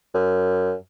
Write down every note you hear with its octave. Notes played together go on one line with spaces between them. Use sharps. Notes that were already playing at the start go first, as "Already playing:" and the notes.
F#2